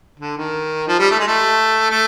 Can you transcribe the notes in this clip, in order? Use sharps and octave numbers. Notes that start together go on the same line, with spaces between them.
D3
D#3
F3
G3
A3
G#3
A3
A3